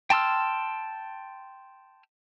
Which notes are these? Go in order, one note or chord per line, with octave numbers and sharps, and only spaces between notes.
G5 A5 C6 E6 F6